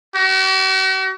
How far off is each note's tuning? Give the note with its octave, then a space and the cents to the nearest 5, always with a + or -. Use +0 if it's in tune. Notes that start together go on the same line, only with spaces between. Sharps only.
F#4 +45